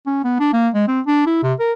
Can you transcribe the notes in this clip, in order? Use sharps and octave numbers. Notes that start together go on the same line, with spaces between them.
C#4
B3
D4
A#3
G#3
C4
D4
E4
C3
A#4